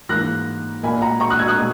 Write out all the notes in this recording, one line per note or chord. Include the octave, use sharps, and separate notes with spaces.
G#2 E3 A#3 F#6 A#6
A#2 A#3 G#5 B5
F#5 A#5
A#5 C#6
D#6 F#6
E6 G#6
D#6 F#6
B2 G#3